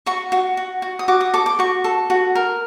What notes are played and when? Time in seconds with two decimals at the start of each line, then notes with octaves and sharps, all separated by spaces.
0.06 F#4 C#6
0.32 F#4
0.57 F#4
0.82 F#4
0.99 D#6
1.08 F#4 D6
1.21 D#6
1.34 A4 D6
1.46 D6
1.59 F#4 C#6
1.84 A4
2.10 F#4
2.35 A#4